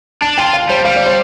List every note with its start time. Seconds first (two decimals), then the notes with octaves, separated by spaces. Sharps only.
0.21 D4 A5
0.38 F4 G5
0.53 F5
0.69 G3 C5
0.85 G3 F5
0.96 D5
1.06 C5